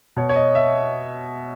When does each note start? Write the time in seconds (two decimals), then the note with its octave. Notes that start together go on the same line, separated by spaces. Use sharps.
0.17 B2 C#5
0.29 C#5
0.36 D#5
0.55 E5